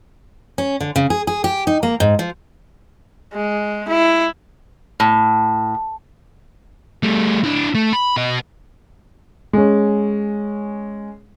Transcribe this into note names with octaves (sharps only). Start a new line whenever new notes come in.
C#4
D3
C#3
G#4
G#4
G4
D#4
A#3
G#2
F3
G#3
E4
A2
G3 A3
D4 E4
A3
B5
B2 D#5
G#3 C#4